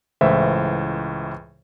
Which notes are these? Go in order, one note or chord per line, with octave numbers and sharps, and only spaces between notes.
C#2 A2 E3 C5 E5